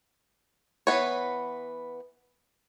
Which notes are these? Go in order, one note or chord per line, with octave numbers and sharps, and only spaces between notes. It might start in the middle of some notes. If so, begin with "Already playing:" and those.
E3 B3 C#5